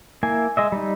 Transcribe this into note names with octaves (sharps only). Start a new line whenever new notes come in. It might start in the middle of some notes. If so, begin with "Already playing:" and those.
A#3 E4 G#5
G#3 D#5 E5
G3 D#4